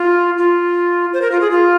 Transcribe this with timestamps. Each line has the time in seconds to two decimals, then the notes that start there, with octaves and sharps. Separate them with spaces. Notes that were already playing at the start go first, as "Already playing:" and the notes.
Already playing: F4
0.38 F4
1.13 C5
1.22 A#4
1.31 F4
1.41 G#4
1.51 F4